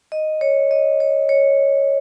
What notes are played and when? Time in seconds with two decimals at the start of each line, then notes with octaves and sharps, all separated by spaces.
0.12 D#5
0.41 C#5
0.71 D#5
1.00 C#5
1.29 C#5